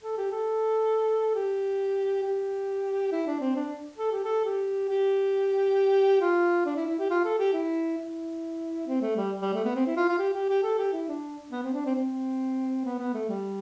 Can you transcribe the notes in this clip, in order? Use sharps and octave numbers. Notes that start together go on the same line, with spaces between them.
A4
G4
A4
G4
G4
E4
D4
C4
D4
A4
G4
A4
G4
G4
F4
D4
E4
E4
G4
F4
A4
G4
E4
E4
C4
A3
G3
G3
A3
B3
C4
E4
F4
F4
G4
G4
G4
A4
G4
E4
D4
B3
C4
D4
C4
C4
B3
B3
A3
G3